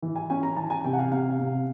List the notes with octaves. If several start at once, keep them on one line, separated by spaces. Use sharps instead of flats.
E3
G#5
C#4 G#5
A#5
E3 A5
G#5
C3 G5
F#5
F5
C3 F5
C3